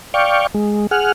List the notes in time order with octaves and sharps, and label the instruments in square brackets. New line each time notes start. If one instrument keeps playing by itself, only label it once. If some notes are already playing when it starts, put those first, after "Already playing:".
[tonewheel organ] D5 F5 G5 C#6
G#3
G#4 F#5 F6